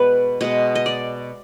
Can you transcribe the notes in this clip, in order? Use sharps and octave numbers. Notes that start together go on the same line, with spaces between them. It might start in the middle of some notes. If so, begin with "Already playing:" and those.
Already playing: B2 G#3 B3 B4 D5
B2 G#3 B3 D#5
D#5
D5